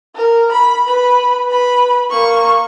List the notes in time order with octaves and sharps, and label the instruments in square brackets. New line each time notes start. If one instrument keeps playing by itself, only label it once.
[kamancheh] A#4
B5
B4 B5
B4 B5
A#3 C#6